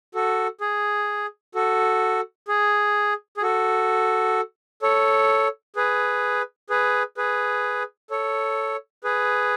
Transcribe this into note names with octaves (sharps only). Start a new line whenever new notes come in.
F#4 A4
G#4
F#4 A4
G#4
G#4
F#4 A4
A4 C#5
G#4 B4
G#4 B4
G#4 B4
A4 C#5
G#4 B4